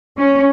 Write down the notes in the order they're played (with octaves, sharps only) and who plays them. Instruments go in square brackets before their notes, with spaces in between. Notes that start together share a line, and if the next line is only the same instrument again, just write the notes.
[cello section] C#4